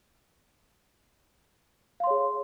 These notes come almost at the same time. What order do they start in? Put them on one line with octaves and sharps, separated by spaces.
F5 C6 C#5 G#4